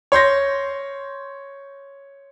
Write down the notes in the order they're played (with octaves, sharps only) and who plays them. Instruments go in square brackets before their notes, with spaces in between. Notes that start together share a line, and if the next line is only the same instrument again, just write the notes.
[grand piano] C#5 C6 G6 A#6